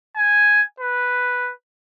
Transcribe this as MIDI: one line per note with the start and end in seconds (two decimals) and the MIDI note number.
0.16 0.63 80
0.80 1.52 71